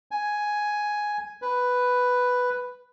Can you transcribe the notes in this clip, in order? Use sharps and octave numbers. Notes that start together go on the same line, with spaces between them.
G#5
B4